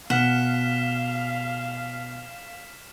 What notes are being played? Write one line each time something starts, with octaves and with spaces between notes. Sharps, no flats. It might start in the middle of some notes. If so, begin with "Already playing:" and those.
B2 F5 F#5 F6 B6 E7